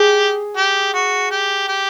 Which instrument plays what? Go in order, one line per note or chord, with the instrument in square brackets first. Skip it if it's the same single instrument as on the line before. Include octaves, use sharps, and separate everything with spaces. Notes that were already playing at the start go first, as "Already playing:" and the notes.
Already playing: [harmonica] G4 [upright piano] G#4
[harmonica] G4
F#4
G4
G4